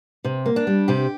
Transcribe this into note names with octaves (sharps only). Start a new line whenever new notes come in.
C3
A#3
D4
G3
C3 G4